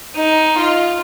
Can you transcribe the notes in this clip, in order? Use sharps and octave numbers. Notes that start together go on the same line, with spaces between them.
D#4
F4